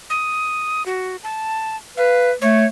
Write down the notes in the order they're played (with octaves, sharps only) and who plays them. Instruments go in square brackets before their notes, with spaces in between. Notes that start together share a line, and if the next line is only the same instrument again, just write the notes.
[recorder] D#6
F#4
A5
[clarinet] B4 [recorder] F5
[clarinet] A3 [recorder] C#5